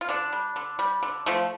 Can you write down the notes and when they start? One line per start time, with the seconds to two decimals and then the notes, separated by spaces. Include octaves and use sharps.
0.01 F4
0.09 D3 D4
0.33 G3
0.56 D3
0.79 G3
1.03 D3
1.26 F3 A3